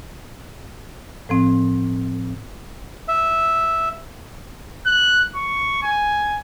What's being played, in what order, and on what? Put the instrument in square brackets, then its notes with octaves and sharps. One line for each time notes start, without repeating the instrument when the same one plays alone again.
[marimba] A2 F3 C4
[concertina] E5
[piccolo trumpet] F#6
C#6
G#5